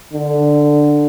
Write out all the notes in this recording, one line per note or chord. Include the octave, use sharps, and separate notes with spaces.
D3